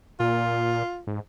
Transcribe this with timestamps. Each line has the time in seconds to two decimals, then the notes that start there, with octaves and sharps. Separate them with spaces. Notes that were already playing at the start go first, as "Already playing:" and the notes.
0.20 A#2 F4
1.07 G#2